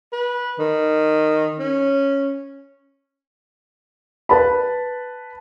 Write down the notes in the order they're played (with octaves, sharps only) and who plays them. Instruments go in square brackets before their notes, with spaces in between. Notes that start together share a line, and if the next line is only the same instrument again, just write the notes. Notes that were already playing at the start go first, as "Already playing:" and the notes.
[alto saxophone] B4
D#3
C#4
[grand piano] B4 A5 B5